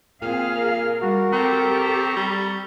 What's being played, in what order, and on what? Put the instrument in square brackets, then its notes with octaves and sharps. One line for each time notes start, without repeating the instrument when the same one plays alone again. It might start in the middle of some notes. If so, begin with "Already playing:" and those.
[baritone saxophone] A#2 [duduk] C4 [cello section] G#4 F5 [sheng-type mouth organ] F6
[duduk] A#4
[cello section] G3 [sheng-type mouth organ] F#4 [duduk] A#4
[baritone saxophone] C4 [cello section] G4 A4 [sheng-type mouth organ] A#5 C#6
[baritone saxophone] G3